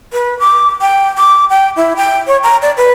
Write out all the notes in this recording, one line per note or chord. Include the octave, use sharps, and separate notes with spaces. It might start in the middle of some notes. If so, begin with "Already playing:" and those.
B4
D6
G5
D6
G5
E4
G5
C#5
A#5
D5
B4